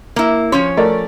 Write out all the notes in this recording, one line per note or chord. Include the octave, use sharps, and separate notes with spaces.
A#3 E4
F3 C#4 C#5 C6
A3 A#4 D5